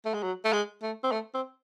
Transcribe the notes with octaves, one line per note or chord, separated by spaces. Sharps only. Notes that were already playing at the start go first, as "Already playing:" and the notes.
A3
G#3
F#3
A3
G#3
A3
C4
A3
C4